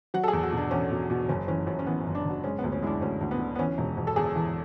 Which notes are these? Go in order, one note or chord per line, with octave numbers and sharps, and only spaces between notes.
F#3 F#5
A4
G#4
E2
F#4
B2 D4
E2 C#4
B2
B2
F#1 C#4
E3 C#4
F#2 C#4
C#4
E3 B3
C#4
F#1
D4
F#1 F#4
G#3 C#4
D2 B3
C#4
G#3 D4 E4
D2 C#4
D2
B3
D3
B3
E3 C#4
E1
E1
A4
E2 G#4
E3